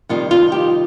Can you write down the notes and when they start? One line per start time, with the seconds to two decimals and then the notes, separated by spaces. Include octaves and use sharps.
0.09 F2 C3 D#3 G3 F4
0.31 F4
0.52 G4